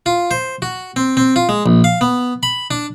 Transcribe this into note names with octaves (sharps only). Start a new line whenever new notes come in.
F4
C5
F#4
C4
C4
F4
G#3
A#1
F5
B3
B5
D4